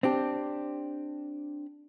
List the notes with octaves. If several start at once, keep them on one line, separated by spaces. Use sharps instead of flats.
C4 D4 G4